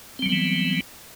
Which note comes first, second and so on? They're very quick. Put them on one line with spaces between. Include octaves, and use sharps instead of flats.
C4 G3 F#3 B3 E3